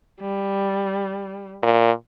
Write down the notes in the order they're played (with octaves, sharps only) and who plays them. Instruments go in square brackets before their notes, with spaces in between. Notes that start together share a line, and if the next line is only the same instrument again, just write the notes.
[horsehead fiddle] G3
[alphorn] A#2